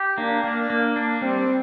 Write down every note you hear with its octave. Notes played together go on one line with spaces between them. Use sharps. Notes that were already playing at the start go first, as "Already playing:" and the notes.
Already playing: G4
A#3 D4
A#3
A#3
D4
G3 C4